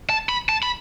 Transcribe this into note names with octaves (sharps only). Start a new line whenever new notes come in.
A5
B5
A5
B5